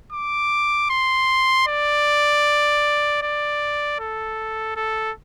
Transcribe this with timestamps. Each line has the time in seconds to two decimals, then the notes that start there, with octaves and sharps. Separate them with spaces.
0.13 D6
0.90 C6
1.67 D5
3.22 D5
4.00 A4
4.77 A4